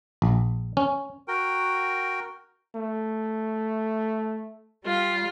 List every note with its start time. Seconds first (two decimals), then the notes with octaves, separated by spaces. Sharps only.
0.22 A#1
0.77 C#4
1.28 F#4 A#4 G5
2.75 A3
4.82 G3 F4